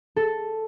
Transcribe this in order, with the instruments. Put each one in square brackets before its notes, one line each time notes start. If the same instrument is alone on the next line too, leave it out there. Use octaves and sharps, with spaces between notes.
[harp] A4